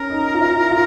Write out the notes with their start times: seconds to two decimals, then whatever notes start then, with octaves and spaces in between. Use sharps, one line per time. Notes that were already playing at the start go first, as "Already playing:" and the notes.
Already playing: C#4 A#4
0.10 D#4
0.34 F4
0.40 E4
0.71 F4